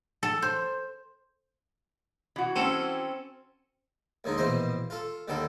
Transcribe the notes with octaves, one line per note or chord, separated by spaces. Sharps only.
A4
C5
E3 F#4
C4 C#4 A4
D#2 D3 G#3 D#4
A#1 B2 E3 C5 D#5 C6
F4 A4
D#2 D3 D#3 G3 A4